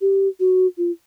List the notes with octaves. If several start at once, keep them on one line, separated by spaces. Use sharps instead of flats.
G4
F#4
F4